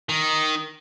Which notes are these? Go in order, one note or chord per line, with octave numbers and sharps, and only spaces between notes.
D#3